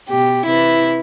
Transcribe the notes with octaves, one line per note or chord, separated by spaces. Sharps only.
B2 G4
C3 E3 E4